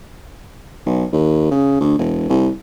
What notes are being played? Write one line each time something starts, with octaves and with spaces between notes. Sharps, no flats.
B1
D#2
C#3
D2
E1
C2